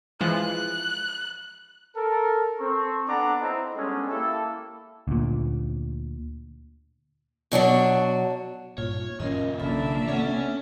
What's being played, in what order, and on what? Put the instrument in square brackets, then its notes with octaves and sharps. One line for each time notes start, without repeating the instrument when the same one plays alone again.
[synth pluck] E3 F3 G#3 [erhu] F#6
[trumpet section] A4 A#4
C4 A4 C#6
B3 D4 A4 F#5 A#5 D6
C4 D#4 E4
G3 G#3 B3 C#4 D4 A4
A#3 E4 G4 A4
[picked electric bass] D2 A#2
[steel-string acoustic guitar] B2 F#3 D4 F#4
[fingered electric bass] G2 A#2 [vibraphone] F4 [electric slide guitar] C#5
[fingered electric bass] F#2 A#2 C#4 [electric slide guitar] D#3 F3 [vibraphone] A#4 D#5
[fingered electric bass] B1 C#3 [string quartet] A#3 D4 E5 [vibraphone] F4 A4 B5
[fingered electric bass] C3 B3 [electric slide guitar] C#4 C#5 [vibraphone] A4 F#5